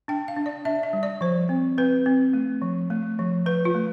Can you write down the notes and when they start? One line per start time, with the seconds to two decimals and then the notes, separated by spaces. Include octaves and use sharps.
0.08 D4 G5
0.28 F5
0.36 D4
0.46 D5
0.65 D4 E5
0.83 E5
0.93 G3
1.03 D5
1.21 F3 C5
1.49 C4
1.78 C4 B4
2.06 C4
2.33 A3
2.62 F3
2.90 A3
3.19 F3
3.46 F3 B4
3.65 F4
3.75 A3